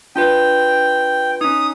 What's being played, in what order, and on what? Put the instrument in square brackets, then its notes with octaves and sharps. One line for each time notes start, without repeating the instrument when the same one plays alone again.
[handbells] D4 F4 B4 [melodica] G5
[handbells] C#4 D#4 [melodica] D#6